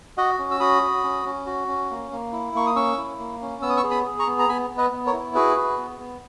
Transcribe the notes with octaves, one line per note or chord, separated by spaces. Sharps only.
F#4 D#5 F#5
C#4
E6
F#4 B5 D#6
F#4
C#4
C#4
F#4
C#4
A#3
A#3
E4
A#3 C#6
D#6
C#4 C#6 E6
E4
A#3
C#4
B3 E6
D#6
C#6 E6
G#4
B5 D#6
G#4
A#5 C#6
B3
A#5
B3 G#5 B5
B3
B4 D#5
B3
A#4 C#5
E4
F#4 G#4 B4
F#4
B3
B3